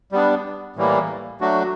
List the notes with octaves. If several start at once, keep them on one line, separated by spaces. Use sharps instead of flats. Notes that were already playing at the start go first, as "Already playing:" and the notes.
G3 B3 D4
A2 E3 G3 A#3
F#3 A3 D4 F#4